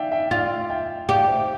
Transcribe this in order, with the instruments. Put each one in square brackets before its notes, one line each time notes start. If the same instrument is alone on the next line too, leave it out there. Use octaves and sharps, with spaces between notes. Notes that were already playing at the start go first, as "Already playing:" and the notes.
Already playing: [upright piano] D5 E5 F5 G5
E5 G5
[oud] F4 [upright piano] D5 F5
[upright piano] E5 G5
[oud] G4 [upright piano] D5 F5
[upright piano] C5 E5